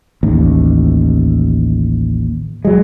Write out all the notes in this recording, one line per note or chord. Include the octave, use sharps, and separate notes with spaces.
A1 D#2
F#3 G#3